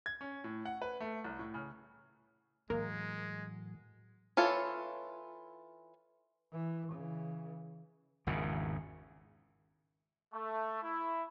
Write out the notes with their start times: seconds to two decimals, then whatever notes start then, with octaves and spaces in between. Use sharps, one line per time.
0.06 G#6
0.21 C#4
0.44 A2
0.65 F#5
0.82 B4
1.00 A3
1.24 C2
1.39 A2
1.54 C#3
2.70 A2 E3 F#3 G#3 A#3
4.37 E3 F4 A4 C#5
6.52 E3
6.92 C#3 E3
8.27 G#1 E2 C#3
10.33 A3
10.82 E4